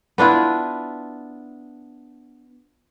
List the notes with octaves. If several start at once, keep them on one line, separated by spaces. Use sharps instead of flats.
B3 D4 E4 F4